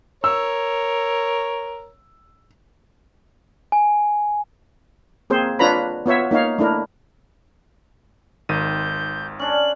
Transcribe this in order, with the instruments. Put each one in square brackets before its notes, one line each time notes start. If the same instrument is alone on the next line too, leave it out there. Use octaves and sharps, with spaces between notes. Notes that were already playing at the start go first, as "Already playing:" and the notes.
[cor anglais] A#4 [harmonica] C#5 [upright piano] E6
[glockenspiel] G#5
[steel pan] A#3 C4 G#4 C5
D4 F4 B4 C#5 A#5 B5
B3 F4 C#5 E5
A#3 D#4 C#5 F5
A3 D4 E4 A#4
[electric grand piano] G#1 D#3 D#7 [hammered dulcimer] F4 [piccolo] G6
[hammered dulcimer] C#4 D4 [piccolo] F#7